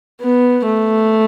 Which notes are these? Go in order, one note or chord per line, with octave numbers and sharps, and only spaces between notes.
B3
A3